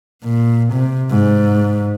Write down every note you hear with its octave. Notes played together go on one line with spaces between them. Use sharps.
A#2
C3
G#2